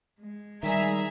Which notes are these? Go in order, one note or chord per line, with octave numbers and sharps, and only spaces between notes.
G#3
D#3 G3 G#4 E5 A#5